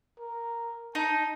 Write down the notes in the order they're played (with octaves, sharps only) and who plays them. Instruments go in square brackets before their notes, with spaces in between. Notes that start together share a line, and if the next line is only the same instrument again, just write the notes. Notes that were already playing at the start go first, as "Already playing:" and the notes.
[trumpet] A#4
[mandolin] D#4 [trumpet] A5